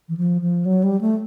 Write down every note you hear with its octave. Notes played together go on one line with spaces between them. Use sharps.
E3
F3
F3
F#3
G3
A3